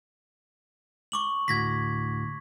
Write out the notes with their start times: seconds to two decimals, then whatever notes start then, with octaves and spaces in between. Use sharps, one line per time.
1.12 C#6 D6 F#7
1.48 D2 A2 F#4 G#6 A#6 B6